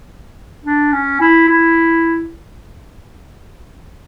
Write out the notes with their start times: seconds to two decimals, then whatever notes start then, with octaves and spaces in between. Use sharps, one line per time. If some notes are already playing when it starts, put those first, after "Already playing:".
0.65 D4
0.92 C#4
1.20 E4
1.48 E4